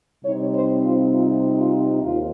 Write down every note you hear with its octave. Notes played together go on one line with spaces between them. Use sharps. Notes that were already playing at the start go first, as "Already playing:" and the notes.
C3 G3 C4 D#4 C#5
C5
F4
F4
F4
D#2 F4